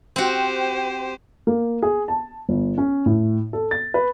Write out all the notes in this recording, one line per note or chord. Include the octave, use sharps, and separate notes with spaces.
C4 F#4 G4 C5
A#3
G#4
A5
G1
C#4
A2
A4
A6
B4